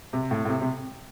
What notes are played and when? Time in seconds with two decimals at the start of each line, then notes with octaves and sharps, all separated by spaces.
0.13 C3
0.31 A2
0.45 A2
0.49 C3
0.61 C3